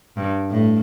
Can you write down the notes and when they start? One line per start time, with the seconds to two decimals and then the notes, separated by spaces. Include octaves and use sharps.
0.17 G2
0.51 A2